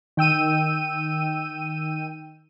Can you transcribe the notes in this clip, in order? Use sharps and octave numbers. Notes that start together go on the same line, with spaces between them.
D#3 G5 E6 D#7